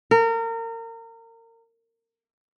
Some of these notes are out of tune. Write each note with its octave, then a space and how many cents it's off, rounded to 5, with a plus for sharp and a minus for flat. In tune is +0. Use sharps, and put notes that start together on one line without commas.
A#4 -30